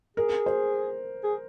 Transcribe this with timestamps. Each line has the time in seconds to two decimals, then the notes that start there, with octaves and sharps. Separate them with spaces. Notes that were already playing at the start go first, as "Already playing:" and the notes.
0.17 G#4 A#4
0.46 C5
1.24 G#4